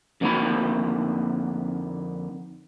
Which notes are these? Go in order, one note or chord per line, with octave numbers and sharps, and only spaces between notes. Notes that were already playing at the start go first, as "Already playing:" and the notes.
F2 D3 A#3 B3 D#4 B5